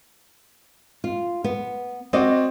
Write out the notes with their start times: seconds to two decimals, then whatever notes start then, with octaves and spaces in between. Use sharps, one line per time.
1.04 F4
1.44 B3
2.13 C4 F#4 D5 D#5